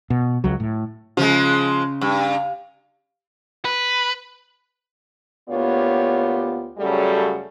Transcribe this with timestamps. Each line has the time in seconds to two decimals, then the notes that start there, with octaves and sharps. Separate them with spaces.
0.10 B2
0.44 C#2 F#3
0.60 A2
1.17 C#3 F3 G#3
2.01 G2
3.65 B4
5.49 D2 A#3 B3 F4 G4 C#5
6.78 F#2 C#3 G3 A3 F#4 A4